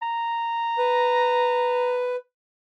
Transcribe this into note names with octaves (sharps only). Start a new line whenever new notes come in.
A#5
B4